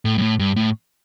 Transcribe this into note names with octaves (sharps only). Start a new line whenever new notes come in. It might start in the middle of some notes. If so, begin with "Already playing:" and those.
A2
G2
A2
G2
A2